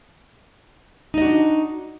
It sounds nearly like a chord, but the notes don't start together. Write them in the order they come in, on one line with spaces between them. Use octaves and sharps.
D#4 D#5 F#4 D4